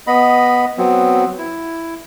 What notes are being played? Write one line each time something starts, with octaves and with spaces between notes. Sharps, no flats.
B3 D#5 B5
F#3 B3 C4
E4